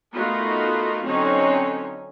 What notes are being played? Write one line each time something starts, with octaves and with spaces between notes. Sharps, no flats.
A3 B3 D#4 F4 F#4 A#4
D3 F#3 C4 C#4 D#4 C#5